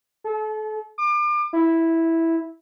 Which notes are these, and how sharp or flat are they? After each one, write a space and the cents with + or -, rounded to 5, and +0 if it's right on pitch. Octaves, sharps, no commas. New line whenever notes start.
A4 -35
D6 +35
E4 -5